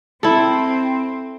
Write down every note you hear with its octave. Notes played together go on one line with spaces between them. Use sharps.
C4 E4 A4